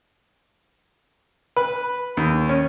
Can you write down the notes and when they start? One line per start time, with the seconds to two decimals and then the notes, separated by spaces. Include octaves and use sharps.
1.56 B4
2.17 D#2
2.49 C#4